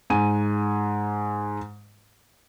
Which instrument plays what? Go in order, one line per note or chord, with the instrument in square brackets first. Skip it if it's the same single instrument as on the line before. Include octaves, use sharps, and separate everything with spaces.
[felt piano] G#2 G#5 D#7